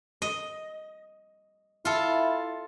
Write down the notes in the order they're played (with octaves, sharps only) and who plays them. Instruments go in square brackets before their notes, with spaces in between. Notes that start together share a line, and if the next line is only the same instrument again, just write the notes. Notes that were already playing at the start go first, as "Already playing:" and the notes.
[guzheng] D#5
[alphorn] E4 [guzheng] F4 A4